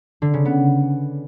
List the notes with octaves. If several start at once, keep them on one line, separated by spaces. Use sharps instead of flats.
D3
C#3
B3